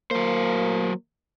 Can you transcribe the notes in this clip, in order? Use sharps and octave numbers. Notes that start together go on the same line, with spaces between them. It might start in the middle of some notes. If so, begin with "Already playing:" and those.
F#3 A#3 C5